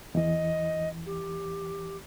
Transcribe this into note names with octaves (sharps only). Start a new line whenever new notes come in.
E2 E3 D#5
G4